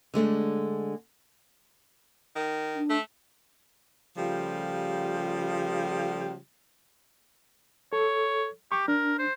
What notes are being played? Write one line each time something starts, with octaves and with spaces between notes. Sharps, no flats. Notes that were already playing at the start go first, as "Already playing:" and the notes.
D3 G#3 A3 D4
D#3
D4
A3
C#3 F3 G3 A3 F4 G4
A4 C#5
G4 C#6
D4 A#4
C5